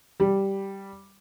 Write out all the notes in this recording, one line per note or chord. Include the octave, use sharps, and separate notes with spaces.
G3